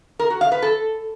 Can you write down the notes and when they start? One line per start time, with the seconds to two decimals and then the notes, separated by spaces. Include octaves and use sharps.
0.19 A#4
0.30 F#4
0.41 F5
0.52 B4
0.62 A4